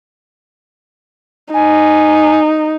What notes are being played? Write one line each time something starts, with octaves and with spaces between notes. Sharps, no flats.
D#4 G#5